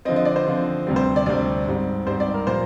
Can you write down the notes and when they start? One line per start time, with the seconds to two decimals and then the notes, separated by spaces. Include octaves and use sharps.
0.05 C4 D#5
0.08 D3 F3
0.16 D#5
0.25 D5
0.36 C5
0.46 D3 F3 C4
0.87 D2 C3 G3 C4
0.96 C5
1.16 D5
1.26 D2 C3 G3 C4 D5
1.67 G#2 G3 C4
2.06 G#2 G3 C4 C5
2.20 D5
2.34 A#4
2.47 A#2 F3 A#3 C5